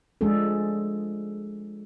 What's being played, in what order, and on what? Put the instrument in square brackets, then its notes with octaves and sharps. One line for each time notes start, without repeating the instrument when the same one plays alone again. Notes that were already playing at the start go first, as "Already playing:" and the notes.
[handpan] F3 G#3 D4 G#4 A4